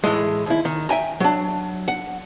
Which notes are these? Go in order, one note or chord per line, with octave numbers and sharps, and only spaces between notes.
A2 E3 G#3
D#2 E4
D#3
E5 G5 G#5 A#5
F#3 D4
F#5